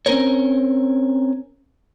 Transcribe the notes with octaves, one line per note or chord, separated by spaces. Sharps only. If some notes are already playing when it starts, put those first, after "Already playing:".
C4 C#4 D#4 A#4 C5 C#5